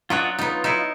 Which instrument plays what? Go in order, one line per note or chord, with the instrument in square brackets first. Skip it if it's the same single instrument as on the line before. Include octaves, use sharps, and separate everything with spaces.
[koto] F#3 D4 C#5 [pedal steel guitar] F4 D#5 F#5
[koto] B3 D#4 [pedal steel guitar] F4
[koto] D#4 E4